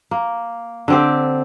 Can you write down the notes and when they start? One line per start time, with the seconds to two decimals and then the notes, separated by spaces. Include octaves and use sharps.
0.11 A#3
0.88 D3 C4 G4